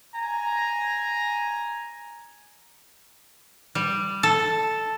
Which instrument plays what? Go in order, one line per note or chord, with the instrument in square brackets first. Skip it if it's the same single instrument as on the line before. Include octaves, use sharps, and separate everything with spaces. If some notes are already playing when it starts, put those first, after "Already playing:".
[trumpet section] G#5 A#5
[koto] G3
A4